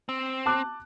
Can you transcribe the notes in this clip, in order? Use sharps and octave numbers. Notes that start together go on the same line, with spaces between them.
C4
A5 D6 F#6